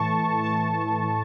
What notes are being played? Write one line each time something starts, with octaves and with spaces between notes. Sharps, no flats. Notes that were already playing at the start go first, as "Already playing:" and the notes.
Already playing: A2 E3 A5 C#6
A5 C#6
A2